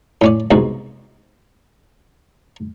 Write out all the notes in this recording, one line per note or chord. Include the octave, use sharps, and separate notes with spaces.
A2 C#4 D5
C2 G#2 B2 G#3